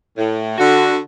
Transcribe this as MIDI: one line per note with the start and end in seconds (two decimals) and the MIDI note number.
0.17 0.58 45
0.58 0.97 50
0.58 0.97 66